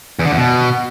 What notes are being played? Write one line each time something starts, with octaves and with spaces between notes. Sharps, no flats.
E2
D3
E2
B2